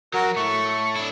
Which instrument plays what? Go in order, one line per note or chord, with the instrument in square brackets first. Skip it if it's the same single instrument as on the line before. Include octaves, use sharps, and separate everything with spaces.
[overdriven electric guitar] F#3 [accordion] F#4 A#4
[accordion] A2 [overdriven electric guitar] A3 [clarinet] C#6
[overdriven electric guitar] D4 E4